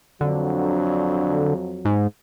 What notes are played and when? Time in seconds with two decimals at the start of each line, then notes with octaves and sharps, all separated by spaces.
0.21 F2 D3 F#3
1.85 G#2